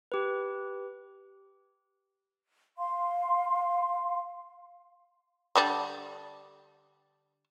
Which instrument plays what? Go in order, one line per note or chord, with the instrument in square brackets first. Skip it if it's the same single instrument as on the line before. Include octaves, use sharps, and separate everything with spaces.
[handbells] G4 B4
[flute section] F5 C6
[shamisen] D3 G3 D4